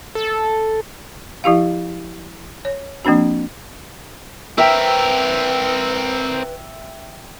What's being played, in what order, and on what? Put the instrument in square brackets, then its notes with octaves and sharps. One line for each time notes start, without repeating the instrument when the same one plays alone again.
[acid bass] A4
[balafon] F3 E4 G4 F5
C#5
F3 A#3 C4 D4 F#4
[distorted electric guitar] C4 A#4 [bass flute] B4 [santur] E5 G5